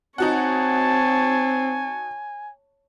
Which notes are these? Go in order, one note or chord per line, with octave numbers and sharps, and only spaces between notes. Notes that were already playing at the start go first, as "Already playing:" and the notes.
C4 D#4 F#4 C#5 F#5 G#5 A5